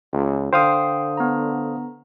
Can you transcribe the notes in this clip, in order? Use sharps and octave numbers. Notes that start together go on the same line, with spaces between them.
C#2
D3 C5 F5 G5 D#6 C7
B3 A#5